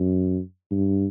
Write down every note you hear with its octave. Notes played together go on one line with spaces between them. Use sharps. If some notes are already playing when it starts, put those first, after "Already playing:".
Already playing: F#2
G2